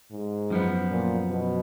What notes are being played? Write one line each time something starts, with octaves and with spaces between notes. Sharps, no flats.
G#2
F#2 F3 B3
A#2
B2